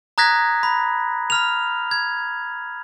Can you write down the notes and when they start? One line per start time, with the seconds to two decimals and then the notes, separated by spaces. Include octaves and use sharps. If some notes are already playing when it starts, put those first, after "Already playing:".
0.18 A#5 D#6 F#6 G#6 A#6 B6
0.63 B5
1.30 B5 F6 F7
1.91 G#6